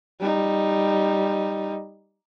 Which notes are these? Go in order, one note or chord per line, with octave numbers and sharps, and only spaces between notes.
G3 D#4